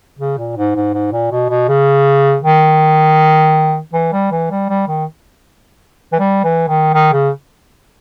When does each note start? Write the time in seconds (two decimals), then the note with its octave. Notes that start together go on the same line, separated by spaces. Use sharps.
0.19 C#3
0.38 A#2
0.57 G#2
0.75 G#2
0.94 G#2
1.12 A#2
1.32 B2
1.50 B2
1.68 C#3
2.43 D#3
3.94 E3
4.13 G3
4.31 E3
4.51 G3
4.69 G3
4.88 D#3
6.13 E3
6.20 G3
6.44 E3
6.68 D#3
6.94 D#3
7.13 C#3